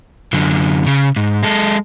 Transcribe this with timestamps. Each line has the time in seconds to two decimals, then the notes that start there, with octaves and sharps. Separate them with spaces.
0.33 F#2 D3
0.86 C#3
1.16 G#2
1.43 G#3 A4